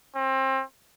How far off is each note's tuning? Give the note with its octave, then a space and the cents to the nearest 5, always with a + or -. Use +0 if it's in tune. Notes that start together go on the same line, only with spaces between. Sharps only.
C4 +30